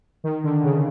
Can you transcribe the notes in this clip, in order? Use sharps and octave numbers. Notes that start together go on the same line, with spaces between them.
D#3
D3
C#3